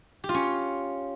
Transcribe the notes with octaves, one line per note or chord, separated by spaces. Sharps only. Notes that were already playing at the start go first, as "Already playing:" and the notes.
G4
F4
C#4